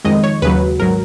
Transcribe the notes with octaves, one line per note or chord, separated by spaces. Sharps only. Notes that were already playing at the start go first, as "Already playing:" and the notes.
F2 D#3 G#3 D#5
C#5
D#2 C#3 F#3 B4
G#1 F#3 A#4